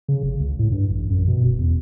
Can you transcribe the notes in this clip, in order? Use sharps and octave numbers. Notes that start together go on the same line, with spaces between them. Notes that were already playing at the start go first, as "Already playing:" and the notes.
C#3
G1
C#2
A2
G2
A1
F#2
B2
E1
E2